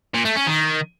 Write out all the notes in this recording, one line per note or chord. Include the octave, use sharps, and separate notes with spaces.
A#2
A3
C#4
D#3